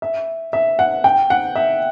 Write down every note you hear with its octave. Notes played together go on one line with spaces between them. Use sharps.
E5
E5
F#5
G5
F#5
E5